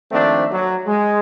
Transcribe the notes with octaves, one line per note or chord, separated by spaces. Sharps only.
D#3 F3 A3 A#3 C4 D4
F#3
G#3